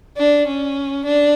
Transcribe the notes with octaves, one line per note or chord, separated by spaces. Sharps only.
D4
C#4
D4